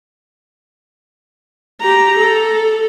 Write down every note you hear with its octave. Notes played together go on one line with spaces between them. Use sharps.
G4 A#5
A4